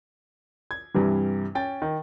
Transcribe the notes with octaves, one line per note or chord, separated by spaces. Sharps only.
G#6
G2 C3 E3 G3
C#4 G5 A6
D#3